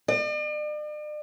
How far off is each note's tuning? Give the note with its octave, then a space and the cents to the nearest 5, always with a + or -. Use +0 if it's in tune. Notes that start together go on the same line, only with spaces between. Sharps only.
D5 +45